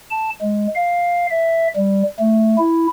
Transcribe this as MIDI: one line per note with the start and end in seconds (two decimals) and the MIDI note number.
0.11 0.30 81
0.41 0.67 56
0.76 1.27 77
1.31 1.68 76
1.76 2.03 55
2.19 2.56 57
2.58 2.87 64